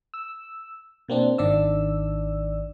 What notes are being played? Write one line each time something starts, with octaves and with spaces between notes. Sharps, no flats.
E6
B2 A#3 C4 D4
G#1 D#3 D4 D5 E6